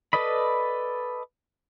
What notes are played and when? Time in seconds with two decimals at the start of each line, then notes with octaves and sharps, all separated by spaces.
0.13 A4 B4 D5 D#5 B5